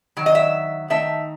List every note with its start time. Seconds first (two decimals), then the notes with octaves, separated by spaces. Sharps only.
0.17 D#3 F#3
0.26 D#5
0.35 E5
0.90 D#3 A3 D#4 E5